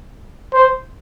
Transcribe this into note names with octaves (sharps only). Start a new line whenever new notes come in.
C5